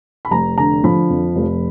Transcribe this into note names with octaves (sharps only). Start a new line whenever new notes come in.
B5
F1 A#5
D3 A#5
F3 B5
F2
F1